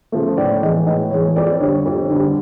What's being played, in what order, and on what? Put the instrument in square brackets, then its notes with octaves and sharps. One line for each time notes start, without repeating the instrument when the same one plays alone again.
[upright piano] C#3 F3 A3
A2 D5
E3 G#3 D#5
A2 D#5
E3 G#3 C#5
F2 D5
D3 G3 C#5
F2
D3 G3